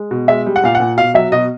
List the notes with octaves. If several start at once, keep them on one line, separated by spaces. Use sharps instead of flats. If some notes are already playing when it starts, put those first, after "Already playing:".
Already playing: G#3
B2
G#3 E5
G3
F#5
A#2 F5
F#5
A#2
B2 F5
F#3 E5
B2 D#5